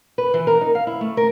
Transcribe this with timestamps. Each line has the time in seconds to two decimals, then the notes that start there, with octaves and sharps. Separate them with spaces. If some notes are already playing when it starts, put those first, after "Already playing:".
0.18 B4
0.34 E3
0.47 A#4
0.61 D#4
0.75 F5
0.87 E4
1.01 A3
1.17 A#4